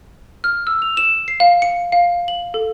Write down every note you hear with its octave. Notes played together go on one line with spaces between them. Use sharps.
F6
E6
F7
E7
C7
F5
C#7
F5
F#7
A4